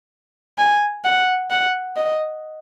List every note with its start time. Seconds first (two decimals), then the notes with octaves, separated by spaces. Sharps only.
0.58 G#5
1.04 F#5
1.50 F#5
1.97 D#5